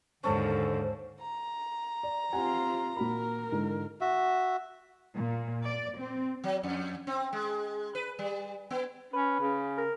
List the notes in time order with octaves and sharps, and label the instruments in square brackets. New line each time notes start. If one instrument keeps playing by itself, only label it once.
[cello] D#2 G#2 [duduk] D3 [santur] C#4 A4 [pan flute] C5
[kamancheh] A#5
[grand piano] D5
[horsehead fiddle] C4 F4 [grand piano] G4 F#5 G#5
[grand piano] A#2 F#4 B5 [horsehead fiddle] A#4
[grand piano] G#2 D3 E3
[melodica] F#4 E5
[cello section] A#2
D5
C4
[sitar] F#3
F2
C4
G#3
B4
G3
B3
[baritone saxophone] C#4 [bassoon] B4
[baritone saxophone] C#3
[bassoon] A#4